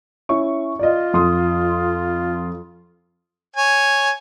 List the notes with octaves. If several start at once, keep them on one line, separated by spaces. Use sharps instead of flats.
C#4 E4 C#6
F4 D5 D#5
F2 C6 D#6
C#5 G#5